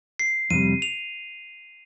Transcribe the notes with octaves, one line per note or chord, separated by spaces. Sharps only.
C7
F2 C3 G3 D#7
F7